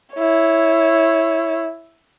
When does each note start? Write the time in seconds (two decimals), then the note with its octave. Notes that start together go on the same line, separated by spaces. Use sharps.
0.15 E4 C#5